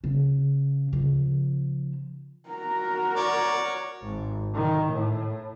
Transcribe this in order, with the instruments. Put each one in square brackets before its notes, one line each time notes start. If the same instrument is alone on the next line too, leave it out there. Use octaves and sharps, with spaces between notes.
[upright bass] C#3
C#3 F3
[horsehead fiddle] F#4 A#4 [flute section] A#5
[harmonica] C#5 D5
[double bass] G#1
D#3
A2